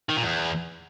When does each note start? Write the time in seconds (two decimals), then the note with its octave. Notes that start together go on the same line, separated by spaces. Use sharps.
0.09 D#3
0.16 A#2
0.23 E2